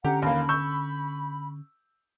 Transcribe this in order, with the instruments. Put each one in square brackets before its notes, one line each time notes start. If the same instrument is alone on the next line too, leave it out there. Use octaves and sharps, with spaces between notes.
[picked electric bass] D3 C#4 [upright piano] G4 [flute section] F#5 A#5
[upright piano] D#2 A#3 [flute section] B5
[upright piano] C#6 E6 G6